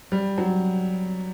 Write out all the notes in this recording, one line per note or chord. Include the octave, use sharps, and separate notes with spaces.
G3
F#3